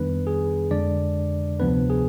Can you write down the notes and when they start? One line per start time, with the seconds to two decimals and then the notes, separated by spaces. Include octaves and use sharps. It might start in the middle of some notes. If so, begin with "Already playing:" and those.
Already playing: F2 D#3 G3 B3 D4 B4
0.27 G#4
0.71 F2 D3 G#3 D4 D5
1.59 D2 C3 F3 B3 D4 B4
1.90 G#4